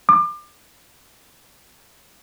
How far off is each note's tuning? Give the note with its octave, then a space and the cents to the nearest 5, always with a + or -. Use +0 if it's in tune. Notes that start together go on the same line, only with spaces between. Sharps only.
D6 +30